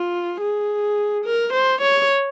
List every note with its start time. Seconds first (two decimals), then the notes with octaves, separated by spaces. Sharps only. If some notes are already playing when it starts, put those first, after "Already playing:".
Already playing: F4
0.41 G#4
1.26 A#4
1.54 C5
1.82 C#5